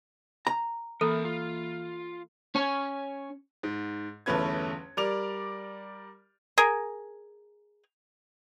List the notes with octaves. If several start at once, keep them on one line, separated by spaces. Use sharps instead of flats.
A#5
E3 A#3 A4 A#4 E5
F4
C#4 C#5 G#5
G#2
G1 E2 A3 C#4 B4 G#6
G3 A#4 D5 D6 F7
G#4 A#4